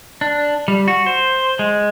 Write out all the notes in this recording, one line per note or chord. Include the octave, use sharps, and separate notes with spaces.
D4
G3
F#4
C5
G#3